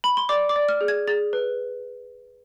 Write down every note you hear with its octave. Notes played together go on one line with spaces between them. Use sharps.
B5
C6
D5 D6
D6
D5
F6
G#4
G#6
G#4 A6
B4